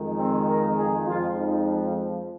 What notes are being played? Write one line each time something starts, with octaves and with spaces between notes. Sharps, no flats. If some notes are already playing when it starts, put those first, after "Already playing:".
Already playing: F2 D#3 G#3
C4
A#4
G#4
F2 F3 G#3 F4
D#4